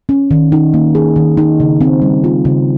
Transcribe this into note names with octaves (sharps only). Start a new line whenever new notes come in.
C#4
D#3
D#4
A#3
G#4
D#3
D#4
C#3
C4
G3
F4
C#3